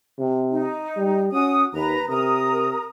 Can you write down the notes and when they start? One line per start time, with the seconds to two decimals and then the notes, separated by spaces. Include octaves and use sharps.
0.19 C3
0.52 D#4
0.97 G3
1.32 C#4 F#4 D#6
1.73 D#2 B4 A#5
2.09 C3 A#4 A#5 D#6